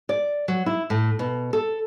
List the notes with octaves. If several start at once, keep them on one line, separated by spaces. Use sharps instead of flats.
D5
F#3
E4
A2
B2
A4